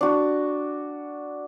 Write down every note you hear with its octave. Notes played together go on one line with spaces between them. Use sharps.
D4 F#4